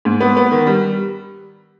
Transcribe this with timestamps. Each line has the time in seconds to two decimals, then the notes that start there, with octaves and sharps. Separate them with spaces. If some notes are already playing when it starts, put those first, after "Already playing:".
0.05 G#2
0.21 B3
0.37 B3
0.52 D#3
0.66 G3